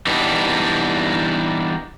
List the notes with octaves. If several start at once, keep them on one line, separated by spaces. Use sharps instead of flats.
E3 G3 B3 D4 D#4